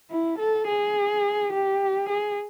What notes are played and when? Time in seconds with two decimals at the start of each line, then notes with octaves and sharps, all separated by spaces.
0.11 E4
0.39 A4
0.67 G#4
1.53 G4
2.09 G#4